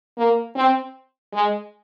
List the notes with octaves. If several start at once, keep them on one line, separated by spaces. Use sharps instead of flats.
A#3
C4
G#3